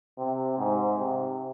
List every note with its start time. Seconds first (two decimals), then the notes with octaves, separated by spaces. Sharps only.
0.18 C3
0.58 G#2
0.98 C3